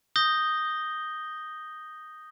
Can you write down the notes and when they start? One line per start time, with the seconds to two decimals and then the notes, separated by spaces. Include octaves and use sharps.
0.16 D#6 G6 A#6 G7